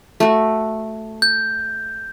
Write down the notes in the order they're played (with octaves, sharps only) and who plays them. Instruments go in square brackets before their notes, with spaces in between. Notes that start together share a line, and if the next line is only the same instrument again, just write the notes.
[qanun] A3 F#4
[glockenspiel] G6